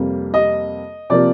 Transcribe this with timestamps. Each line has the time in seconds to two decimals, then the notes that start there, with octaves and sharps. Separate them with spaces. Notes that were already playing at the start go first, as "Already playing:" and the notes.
Already playing: F2 C3 G3 A#3
0.34 D#5
1.10 C3 F3 A#3 D5